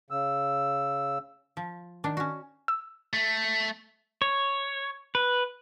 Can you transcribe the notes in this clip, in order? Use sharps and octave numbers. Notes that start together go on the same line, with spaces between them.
C#3 E6
F3
D#3 D4
C#4 F#4
E6
A3
C#5
B4